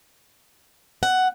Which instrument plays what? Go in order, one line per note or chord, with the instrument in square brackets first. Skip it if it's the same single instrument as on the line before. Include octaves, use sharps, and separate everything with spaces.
[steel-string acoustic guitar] F#5